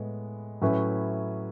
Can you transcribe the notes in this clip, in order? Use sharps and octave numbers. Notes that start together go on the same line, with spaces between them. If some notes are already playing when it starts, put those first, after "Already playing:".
Already playing: A2 G#3 B3
A2 F#3 C#4 E4 B4